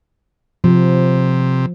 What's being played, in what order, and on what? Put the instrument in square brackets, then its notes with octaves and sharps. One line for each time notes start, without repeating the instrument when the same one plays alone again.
[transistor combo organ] C3 [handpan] F3